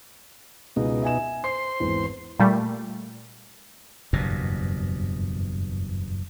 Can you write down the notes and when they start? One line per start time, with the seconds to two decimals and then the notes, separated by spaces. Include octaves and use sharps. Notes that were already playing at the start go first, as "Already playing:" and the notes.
0.76 C#2 B2 G#3 D#4
1.02 E5 G#5 E7
1.44 C5 C6 C7
1.80 G#1 E2
2.39 A#2 G3 A3
4.13 F#1 E2 G2 B2